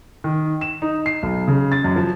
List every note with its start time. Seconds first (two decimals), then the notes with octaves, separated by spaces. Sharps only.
0.24 D#3
0.61 E7
0.82 D#4
1.06 C7
1.23 B1
1.48 C#3
1.72 A6
1.84 F#2
1.96 F3